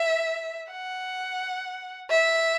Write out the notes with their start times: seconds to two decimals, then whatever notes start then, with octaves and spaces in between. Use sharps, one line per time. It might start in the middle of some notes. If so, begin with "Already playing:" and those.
Already playing: E5
0.71 F#5
2.10 E5